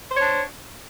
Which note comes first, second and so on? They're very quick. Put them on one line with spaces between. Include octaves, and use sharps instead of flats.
C5 C#5 D4